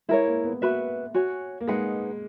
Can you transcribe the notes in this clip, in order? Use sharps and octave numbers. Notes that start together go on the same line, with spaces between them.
G#3 E4 A#4 C#5
A#3
B3
A#3 F#4 B4 E5 B5
F#4 C#5 G#5
A#3
G#3 D#4 G#4 B4 F#5